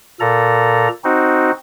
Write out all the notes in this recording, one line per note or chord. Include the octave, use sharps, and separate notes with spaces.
A#2 A4 A#5
C4 D#4 F#4